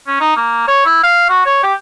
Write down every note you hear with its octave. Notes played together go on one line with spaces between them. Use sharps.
C#4
D#4
A#3
C#5
E4
F5
F#4
C#5
G4